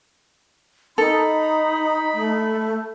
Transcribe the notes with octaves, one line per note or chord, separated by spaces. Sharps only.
D#4 A4 B5
A3